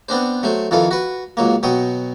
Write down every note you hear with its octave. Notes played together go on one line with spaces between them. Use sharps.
B3 C4 D4 C5
F#3 A3 C5
F2 D#3 E3 A4 F5
F#4 B4
C#2 F#3 A#3
B2 F#3 G5 D#6